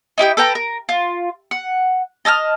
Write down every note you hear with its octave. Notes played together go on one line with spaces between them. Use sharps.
D#4 E4 G4 G5
A4 B4 G5 A#5
A#4
F4
F#5
D#5 A5 E6 F6